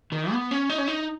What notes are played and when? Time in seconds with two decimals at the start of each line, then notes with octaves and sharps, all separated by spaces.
0.12 D#3
0.32 B3
0.51 C#4
0.70 D#4
0.78 C#4
0.88 D#4